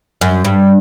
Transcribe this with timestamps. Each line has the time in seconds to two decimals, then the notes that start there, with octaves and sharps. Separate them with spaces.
0.21 F#2
0.45 G2